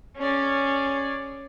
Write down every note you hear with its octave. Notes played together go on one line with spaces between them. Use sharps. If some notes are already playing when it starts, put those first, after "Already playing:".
C#4 G#4 D5